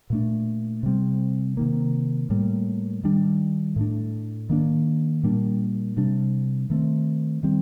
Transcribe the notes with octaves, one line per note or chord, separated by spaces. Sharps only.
A#2 A3 D4
C3 G3 C4
C3 D#3 A#3
A2 G3 A#3
D#3 G3 D4
A2 A3 D4
D#3 A#3 D4
A#2 G3 A#3 D4
C3 G3 D4
D#3 A3 C4
D#3 G3 C4